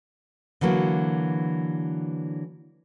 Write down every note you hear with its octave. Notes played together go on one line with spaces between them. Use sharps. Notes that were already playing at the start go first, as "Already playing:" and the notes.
D3 E3 F#3 A#3